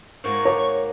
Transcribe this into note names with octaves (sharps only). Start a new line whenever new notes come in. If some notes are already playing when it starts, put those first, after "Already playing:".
G#2 A#3 F#4 C#6
C#5 D6